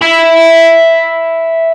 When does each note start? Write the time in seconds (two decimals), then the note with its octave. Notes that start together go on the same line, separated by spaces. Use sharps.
0.01 E5 B5